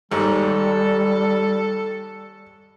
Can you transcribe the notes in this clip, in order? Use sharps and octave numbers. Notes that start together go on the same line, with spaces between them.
D#2 G#2 G3 A4